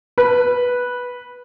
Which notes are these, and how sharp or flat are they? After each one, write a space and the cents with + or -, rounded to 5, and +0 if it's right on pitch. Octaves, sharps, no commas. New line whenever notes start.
B4 -10